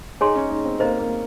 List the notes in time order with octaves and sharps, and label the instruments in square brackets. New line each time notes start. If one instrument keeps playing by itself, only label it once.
[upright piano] D#4 [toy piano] G#4 C#5 G#5 C6
[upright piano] C#4
D#4
C4
[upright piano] A#3 [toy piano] C5 D#5 A#5
[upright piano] A#3